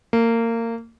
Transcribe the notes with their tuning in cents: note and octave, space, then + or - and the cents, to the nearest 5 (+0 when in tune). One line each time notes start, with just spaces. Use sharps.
A#3 -25